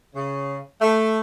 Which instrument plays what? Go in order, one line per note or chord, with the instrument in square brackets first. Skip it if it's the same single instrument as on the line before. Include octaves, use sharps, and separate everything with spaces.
[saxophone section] C#3
A3